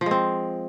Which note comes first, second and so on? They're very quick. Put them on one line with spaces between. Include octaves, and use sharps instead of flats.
F3 G#3 C4